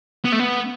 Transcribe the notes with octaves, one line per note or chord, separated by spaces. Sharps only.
B3
A3
B3